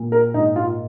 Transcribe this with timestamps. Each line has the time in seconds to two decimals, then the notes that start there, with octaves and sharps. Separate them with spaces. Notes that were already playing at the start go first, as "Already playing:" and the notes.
Already playing: A#2
0.12 A#4
0.34 G#2 D#4
0.56 F4